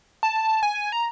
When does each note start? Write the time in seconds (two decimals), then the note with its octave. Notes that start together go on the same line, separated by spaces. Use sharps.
0.23 A5
0.63 G#5
0.92 A#5